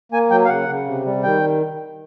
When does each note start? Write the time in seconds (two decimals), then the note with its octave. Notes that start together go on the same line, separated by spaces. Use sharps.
0.12 A#3 G#5
0.30 F#3 G5
0.45 F5
0.49 C#3 F#5
0.69 C#3
0.86 C3
1.06 G3
1.23 D#3 G5